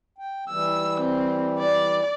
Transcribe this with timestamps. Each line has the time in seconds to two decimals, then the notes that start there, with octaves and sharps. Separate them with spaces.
0.18 G5
0.50 E3 G3 E6
1.01 C4
1.59 D5